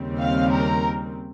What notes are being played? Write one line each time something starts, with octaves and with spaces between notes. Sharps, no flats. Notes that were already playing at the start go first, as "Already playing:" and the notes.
Already playing: D#2 C#3 G3 C4
F5
A#4